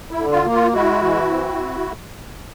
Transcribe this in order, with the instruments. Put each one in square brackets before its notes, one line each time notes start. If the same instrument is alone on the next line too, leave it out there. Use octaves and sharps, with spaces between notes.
[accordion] E4
D3
F4
A#3
F4
G#3 E4 F#4
E3
C4